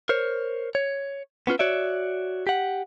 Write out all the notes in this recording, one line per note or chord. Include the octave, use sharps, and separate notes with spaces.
A#4 C5 C#5
C#5
B3 C#4 F4 B4
F#4 C#5 D5 E5
G4 F#5